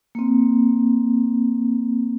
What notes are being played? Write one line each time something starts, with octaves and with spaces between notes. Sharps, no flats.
A#3 C4